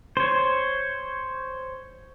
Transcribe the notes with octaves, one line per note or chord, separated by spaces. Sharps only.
C5 C#5